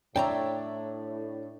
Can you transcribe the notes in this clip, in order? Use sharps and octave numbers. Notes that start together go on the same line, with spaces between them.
A2 D4 C#5 D5 E5 G5 A5 A#5